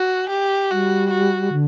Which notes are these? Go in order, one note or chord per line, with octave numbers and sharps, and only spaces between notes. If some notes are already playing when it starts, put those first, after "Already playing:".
Already playing: F#4
G4
G3 F#4
F#4
D3